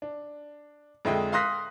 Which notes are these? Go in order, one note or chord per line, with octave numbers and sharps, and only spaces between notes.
D4
F2 D3 G#3 D#5 E5 G5
F5 C6 D#6 F#6 A#6 B6